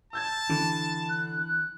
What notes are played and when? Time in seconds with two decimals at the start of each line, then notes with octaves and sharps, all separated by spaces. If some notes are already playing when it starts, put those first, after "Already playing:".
0.13 A5 E6 G6 G#6
0.49 D3 E3
1.09 F#6
1.41 F#6